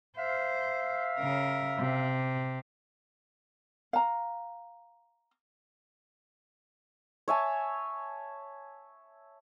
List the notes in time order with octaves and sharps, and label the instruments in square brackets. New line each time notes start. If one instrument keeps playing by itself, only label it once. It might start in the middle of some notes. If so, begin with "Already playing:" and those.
[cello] C5 [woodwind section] E5 F5
[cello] C#3 A#4
C3
[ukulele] F5 A#5
[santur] C#5 E5 G#5 A5